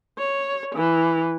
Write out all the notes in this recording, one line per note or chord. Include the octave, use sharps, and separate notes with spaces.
C#5
E3